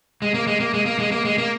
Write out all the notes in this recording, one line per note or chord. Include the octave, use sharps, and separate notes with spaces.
G#3
A#3
G#3
A#3
G#3
A#3
G#3
A#3
G#3
A#3